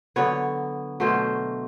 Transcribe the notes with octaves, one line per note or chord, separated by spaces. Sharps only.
D3 F#3 B3 C#5
B2 F#3 A3 C5